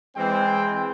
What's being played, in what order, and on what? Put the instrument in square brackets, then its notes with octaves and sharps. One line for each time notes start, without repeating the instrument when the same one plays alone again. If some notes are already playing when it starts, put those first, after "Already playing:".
[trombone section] E3 G#3 C4 [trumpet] G5